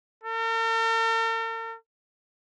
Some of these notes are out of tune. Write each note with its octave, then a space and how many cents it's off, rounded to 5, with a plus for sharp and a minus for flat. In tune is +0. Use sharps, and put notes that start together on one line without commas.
A#4 -45